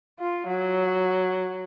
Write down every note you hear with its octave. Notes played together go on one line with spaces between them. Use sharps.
F4
F#3